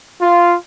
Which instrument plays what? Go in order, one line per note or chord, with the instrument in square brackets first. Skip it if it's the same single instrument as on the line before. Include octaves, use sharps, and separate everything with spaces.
[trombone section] F4